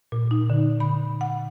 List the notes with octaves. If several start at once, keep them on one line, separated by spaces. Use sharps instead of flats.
A#2
D#4
D3
B5
F#5